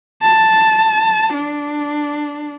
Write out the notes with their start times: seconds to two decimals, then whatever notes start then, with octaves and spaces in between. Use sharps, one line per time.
0.22 A5
1.33 D4